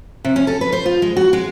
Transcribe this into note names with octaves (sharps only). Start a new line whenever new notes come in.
C3
C#4
A4
B4
C5
F4
G#3
F#4
G#3